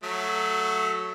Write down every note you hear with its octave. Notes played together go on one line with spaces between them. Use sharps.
F#3 A3